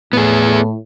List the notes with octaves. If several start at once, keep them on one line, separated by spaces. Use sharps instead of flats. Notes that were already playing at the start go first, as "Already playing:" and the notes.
A2 B3 G#4